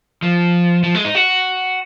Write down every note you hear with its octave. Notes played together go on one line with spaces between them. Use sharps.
F3
F3
G#3
D#4
F#4